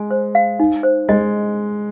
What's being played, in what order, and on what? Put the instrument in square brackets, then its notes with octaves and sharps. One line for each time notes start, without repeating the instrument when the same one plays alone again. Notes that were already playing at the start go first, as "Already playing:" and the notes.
Already playing: [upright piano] G#3 [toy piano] G#5
[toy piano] C5
F5
D#4
C5
[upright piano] G#3 [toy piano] D#5